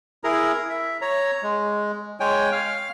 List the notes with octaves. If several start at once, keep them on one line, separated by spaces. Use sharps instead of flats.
E4 G#4 A#4 A#5
E5
C#5 A#5
G#3
G#3 C#5 G5 G#5
F5 F6